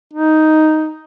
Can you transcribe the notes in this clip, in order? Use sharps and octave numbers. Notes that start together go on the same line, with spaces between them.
D#4